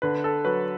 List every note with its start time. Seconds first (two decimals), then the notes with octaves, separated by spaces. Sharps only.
0.02 D3 B4
0.24 A4
0.45 F#3 B4